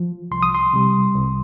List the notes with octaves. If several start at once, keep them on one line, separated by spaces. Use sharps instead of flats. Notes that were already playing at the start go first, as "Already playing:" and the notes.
Already playing: F3
C2 C6
D#6
C6
C3 G3
C2